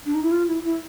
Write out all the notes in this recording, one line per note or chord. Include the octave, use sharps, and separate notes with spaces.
D4
D#4
E4
F4
E4
E4